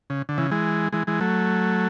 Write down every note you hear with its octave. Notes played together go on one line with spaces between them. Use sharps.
C#3
D3
C#3 E3
E3 G#3
E3 G#3
E3 G#3
F#3 A3